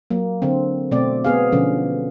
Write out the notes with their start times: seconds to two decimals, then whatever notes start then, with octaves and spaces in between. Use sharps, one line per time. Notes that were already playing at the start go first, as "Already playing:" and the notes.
0.10 F#3 A#3
0.42 D3 C4
0.91 B2 A3 C4 D5
1.25 B3 G#4 F5
1.52 B2 D3 F3 C#4